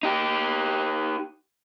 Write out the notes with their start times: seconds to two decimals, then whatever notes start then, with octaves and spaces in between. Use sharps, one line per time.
0.03 D#4 G4